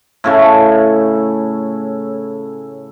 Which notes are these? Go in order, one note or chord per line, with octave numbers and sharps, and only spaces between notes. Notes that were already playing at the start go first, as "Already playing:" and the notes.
A2 C#3 A3